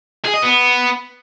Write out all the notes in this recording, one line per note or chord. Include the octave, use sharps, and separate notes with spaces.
G#4
D#5
B3